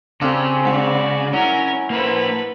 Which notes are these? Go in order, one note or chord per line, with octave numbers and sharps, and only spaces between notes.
C#3 C4 D4 F4 G4 A4
G#2 F#4 D5 A5
F#3 C#4 E4 A#4
A#3 A4 B4 C5